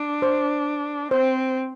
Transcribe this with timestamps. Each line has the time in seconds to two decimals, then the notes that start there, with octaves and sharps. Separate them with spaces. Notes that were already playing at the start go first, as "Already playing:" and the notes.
Already playing: D4
0.22 C5
1.11 C4 C5